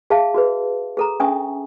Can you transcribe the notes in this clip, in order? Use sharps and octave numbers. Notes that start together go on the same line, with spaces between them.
G#4 E5 F5 A5
F#4 G#4 B4
G#4 A4 A#5
C#4 D4 E5 G#5 C#6 D#6